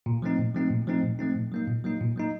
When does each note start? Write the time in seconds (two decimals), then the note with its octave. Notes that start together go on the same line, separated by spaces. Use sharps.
0.06 A#2
0.22 F3 A3 C4 D#4
0.39 A#2
0.55 F3 A3 C4 D#4
0.71 A#2
0.87 F3 A3 C4 D#4
1.03 A#2
1.19 F3 A3 C4 D#4
1.36 A#2
1.52 F#3 A#3 D#4
1.68 A#2
1.84 F#3 A#3 D#4
2.01 A#2
2.16 F#3 A#3 D#4